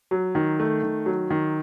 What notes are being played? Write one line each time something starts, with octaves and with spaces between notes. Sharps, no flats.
F#3
D#3
A3
D#3
F#3
D#3